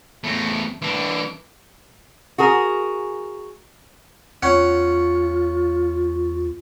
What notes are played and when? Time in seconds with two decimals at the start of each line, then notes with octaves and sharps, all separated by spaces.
0.24 E2 A3
0.82 E3 D4
2.38 F#4 G#4 A#4
4.43 E2 C#4 F4 F#5